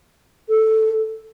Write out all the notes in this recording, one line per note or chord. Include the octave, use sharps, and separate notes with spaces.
A4